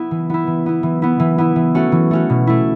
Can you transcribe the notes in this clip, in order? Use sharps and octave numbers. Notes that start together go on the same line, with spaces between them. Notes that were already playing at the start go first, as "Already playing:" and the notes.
Already playing: B3 E4
E3
B3 E4
E3
B3 E4
E3
B3 E4
E3
B3 E4
E3
A3 C#4 F#4
E3
A3 C#4 F#4
B2
A3 E4